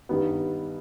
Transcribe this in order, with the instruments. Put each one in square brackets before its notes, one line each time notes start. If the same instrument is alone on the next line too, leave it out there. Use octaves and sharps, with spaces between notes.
[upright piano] G2 D#3 G3 B3